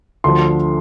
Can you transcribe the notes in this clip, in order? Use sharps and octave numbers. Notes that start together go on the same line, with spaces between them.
D2 D3 F3 C6